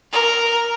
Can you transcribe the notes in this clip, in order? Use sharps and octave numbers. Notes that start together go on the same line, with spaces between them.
A#4